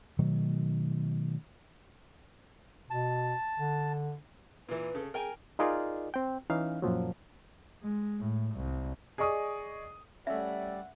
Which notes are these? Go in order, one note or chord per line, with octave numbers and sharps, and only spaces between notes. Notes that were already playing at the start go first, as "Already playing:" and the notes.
B2 D#3 F#3 A3
B2 A5
D3
A#2 E3 B4
C#3 A4
G#4 A#4 G5 G#5
D#4 F4 G#4 A#4 D5 D#5
C4 G5
E3 C#4 D#4 F5
F#2 A#2 F3 F#3
G#3
A2
C2
G#4 D5 D#5 C#6 D#6
G3 A3 C#4 D5 E5 F#5